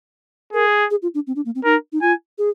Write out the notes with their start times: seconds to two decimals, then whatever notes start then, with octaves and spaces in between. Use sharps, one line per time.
0.53 G#4 A#4
0.91 G#4
1.02 F4
1.15 D4
1.27 C4
1.36 D4
1.45 A#3
1.55 C4
1.64 D#4 A#4
1.93 D#4
2.02 F4 G#5
2.38 G#4